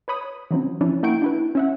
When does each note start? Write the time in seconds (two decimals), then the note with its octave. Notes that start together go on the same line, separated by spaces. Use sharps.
0.08 B4 C#5 B5 D#6
0.51 E3 F#3 C4 C#4
0.81 F3 C#4 D4 E4
1.03 A#3 E4 F#5 G5 C#6 D7
1.22 D4 E4 B4
1.55 C#4 E5 F#5